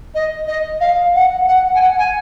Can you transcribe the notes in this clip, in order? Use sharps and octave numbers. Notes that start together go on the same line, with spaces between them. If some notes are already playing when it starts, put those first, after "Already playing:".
D#5
D#5
F5
F#5
F#5
G#5
F#5
G#5